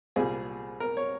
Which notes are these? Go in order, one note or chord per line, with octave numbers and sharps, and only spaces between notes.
C2 A#2 G3 G#4
A#4
C#5